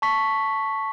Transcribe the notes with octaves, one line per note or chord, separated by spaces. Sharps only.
A5 C#6 B6